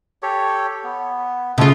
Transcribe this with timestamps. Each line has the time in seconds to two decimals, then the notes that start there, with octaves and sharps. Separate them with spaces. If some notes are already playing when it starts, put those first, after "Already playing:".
0.23 G4 A4 C#5
0.84 B3
1.58 C#3 G#3 A3 F4 A4